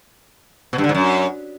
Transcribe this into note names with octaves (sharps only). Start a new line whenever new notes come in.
B2
G2
D3
G#2
F#2